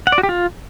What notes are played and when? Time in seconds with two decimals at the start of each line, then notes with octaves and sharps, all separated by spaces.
0.07 F#5
0.12 D5
0.18 F#4
0.23 G4
0.29 F4